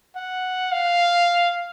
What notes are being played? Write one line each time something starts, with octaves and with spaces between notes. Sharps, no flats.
F#5
F5